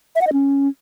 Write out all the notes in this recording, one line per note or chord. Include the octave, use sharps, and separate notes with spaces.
E5
F#5
D#5
C#4